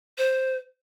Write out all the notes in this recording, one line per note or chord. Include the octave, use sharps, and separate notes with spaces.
C5